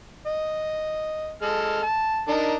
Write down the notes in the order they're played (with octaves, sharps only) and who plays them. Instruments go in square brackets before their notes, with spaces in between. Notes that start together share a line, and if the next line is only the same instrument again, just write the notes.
[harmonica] D#5
G#3 A4 F6
A5
D4 D#4 A#4